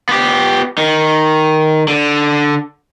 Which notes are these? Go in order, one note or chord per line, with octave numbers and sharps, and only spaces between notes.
B3 G4
D#3
D3